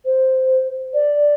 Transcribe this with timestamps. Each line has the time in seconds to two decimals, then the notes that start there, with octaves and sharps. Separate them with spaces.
0.06 C5
0.94 D5